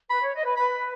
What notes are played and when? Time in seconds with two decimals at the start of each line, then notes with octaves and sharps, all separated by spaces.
0.10 B4 B5
0.21 C#5
0.34 D#5
0.45 B4
0.57 B4 B5